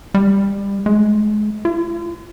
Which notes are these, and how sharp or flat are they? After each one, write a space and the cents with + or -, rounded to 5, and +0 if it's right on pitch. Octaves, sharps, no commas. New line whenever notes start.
G3 +25
G#3 +30
F4 -45